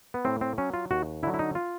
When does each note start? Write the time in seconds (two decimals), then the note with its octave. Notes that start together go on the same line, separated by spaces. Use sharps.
0.14 B3
0.25 A2 C4
0.41 C4
0.58 F#3 C#4
0.74 F4
0.91 D#2 F#4
1.23 D3 E4
1.27 F#3
1.34 E4
1.39 D#4
1.55 F4